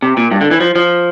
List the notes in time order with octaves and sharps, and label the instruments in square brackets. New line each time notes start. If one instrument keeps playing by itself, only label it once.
[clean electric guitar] C3
A#2
G2
D3
E3
F3
F3